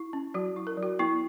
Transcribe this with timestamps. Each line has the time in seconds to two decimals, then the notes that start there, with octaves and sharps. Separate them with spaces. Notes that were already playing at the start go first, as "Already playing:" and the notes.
Already playing: E4
0.13 C#4
0.34 F#3 F#4
0.56 E4
0.67 A#4
0.77 F#3
0.83 F#4
0.99 B3 E4